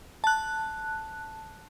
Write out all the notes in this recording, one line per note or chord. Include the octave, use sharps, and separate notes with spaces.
A5 F#6